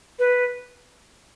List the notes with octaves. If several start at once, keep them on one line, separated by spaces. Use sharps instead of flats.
B4